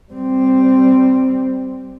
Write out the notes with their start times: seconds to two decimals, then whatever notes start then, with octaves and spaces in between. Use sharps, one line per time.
0.12 G3 C4